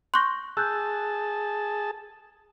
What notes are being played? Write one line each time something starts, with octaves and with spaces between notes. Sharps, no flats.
C6 C#6 F#6 G6 A#6
G#4 A5 E6 F#6 G6